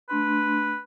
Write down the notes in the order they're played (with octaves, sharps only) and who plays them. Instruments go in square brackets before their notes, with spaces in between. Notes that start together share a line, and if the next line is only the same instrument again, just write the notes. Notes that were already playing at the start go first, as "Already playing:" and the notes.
[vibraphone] A3 D4 C6 [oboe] B4